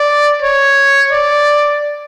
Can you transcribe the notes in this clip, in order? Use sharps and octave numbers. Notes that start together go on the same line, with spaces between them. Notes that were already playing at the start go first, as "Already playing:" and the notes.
Already playing: D5
C#5
D5